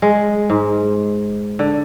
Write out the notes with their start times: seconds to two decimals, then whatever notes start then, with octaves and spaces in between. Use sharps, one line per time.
0.02 G#3
0.50 G#2
1.59 D3